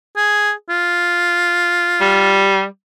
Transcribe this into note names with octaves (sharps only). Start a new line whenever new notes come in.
G#4
F4
G3